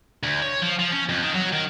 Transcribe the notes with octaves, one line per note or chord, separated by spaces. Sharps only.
D2
C#5
F3
F3
C#4
F2
D#3
F#3
D#3